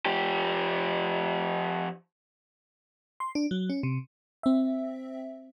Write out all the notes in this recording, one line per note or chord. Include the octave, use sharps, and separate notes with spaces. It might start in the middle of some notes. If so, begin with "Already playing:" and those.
F3 G4
C6
D4
F#3
C#4
C3
C4 E5